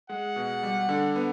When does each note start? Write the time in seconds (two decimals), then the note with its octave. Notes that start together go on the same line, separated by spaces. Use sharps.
0.09 G#3 F#5
0.36 B2
0.63 G3
0.89 D3
1.15 B3